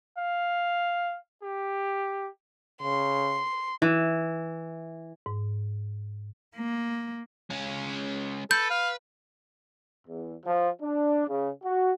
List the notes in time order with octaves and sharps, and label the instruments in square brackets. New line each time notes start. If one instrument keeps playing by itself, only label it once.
[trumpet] F5
G4
[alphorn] C#3 [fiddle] C6
[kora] E3
[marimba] G#2
[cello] A#3
[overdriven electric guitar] G#3 C#4
[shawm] A4 [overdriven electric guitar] B4 [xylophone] G6
[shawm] F5
[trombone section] E2
F3
D4
C#3
F#4